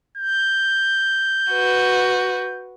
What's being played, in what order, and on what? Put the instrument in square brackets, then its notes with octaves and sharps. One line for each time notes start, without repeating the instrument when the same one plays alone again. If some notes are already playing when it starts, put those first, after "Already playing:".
[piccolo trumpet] G6
[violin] F#4 B4